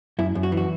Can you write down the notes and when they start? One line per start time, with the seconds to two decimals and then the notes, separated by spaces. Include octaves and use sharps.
0.19 F#2 E4
0.35 F#2
0.43 F#4
0.52 E3
0.57 F#4